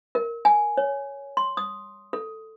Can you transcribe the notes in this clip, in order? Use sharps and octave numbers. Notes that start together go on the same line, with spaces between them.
A#4
G#5
C#5
C6
D#6
A4